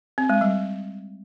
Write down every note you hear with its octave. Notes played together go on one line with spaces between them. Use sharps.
C4
G#3
G3